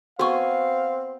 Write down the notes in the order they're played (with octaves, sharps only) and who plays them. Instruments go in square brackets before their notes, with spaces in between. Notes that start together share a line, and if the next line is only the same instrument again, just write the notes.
[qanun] B3 G#5 [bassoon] C4 [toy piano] F#4 C#6 [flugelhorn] F5